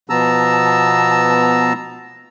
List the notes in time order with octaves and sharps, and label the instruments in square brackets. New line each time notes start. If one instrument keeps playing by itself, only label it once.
[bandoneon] B2 F3 B3 A5 A#5 E6